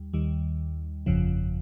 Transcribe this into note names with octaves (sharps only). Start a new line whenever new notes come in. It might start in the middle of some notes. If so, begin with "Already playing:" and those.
Already playing: D#2 G3
D#2 D#3 G3
G1 F2 C#3 F3